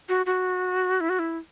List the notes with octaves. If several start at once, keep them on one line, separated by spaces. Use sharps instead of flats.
F#4
F#4
E4
F#4
E4